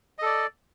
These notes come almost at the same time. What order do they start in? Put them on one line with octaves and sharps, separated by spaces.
D#5 A4 D5